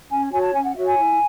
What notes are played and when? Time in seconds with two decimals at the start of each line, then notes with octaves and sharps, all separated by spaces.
0.10 C#4 G#5
0.31 F#4 C#5 G#5
0.42 A5
0.53 C#4 G#5
0.64 F#5
0.75 F#4 C#5 E5
0.86 G#5
0.96 E4